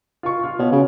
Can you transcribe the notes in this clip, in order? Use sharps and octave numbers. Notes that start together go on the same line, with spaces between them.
F4 C#6
F4 F6
B2 C#5
C#3